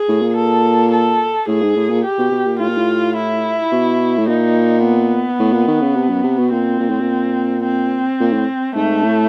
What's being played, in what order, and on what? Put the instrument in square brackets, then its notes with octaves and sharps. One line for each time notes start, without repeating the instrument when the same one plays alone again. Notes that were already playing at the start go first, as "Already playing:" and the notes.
Already playing: [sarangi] G#4
[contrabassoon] A2
A#2
[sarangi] A4
A4
[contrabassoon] A2 [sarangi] G#4
[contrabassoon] G#2
A2
A#2
[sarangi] G4
[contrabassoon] B2
B2
A#2
[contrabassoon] A2 [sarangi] F4
[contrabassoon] A#2
A2
[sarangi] E4
[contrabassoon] B2
A2
[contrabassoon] A#2 [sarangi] D#4
[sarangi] B3
[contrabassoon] A2
A#2
D#3
C#3
C3
F#2
C3
B2
[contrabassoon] A#2 [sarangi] C4
[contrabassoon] A#2
A2
A#2
[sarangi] C4
[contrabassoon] A#2
A2
[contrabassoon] G#2 [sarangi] A3
[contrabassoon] A2